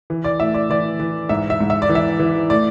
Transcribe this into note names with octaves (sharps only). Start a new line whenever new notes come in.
E3
D5
A2 E5
D5
E3 D5
E3
G#2 E5
E5
G#2
E5
D5
E3
E5
E3
A2 D5